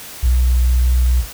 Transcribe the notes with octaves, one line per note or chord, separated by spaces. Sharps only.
B1